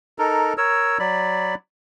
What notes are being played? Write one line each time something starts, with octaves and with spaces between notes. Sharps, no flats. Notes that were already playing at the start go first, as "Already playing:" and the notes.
D#4 A4 A#4
A#4 C#5 E6
F#3 D5 B5